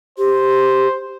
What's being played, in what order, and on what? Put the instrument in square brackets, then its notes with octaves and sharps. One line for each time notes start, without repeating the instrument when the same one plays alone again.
[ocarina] G4 [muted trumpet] C5